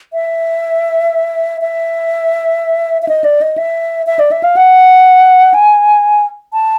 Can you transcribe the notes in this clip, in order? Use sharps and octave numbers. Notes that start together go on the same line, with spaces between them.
E5
E5
E5
D#5
D5
D#5
E5
E5
D5
E5
F5
F#5
G#5
A5